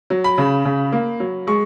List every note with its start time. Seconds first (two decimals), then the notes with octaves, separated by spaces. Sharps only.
0.10 F#3
0.24 B5
0.38 C#3
0.65 C#3
0.92 A#3
1.20 F#3
1.47 G#3 C#6